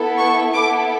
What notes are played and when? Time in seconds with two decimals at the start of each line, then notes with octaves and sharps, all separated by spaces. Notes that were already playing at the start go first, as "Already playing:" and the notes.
Already playing: B3 E4 A4
0.18 C#6
0.54 B3 E4 A4 D6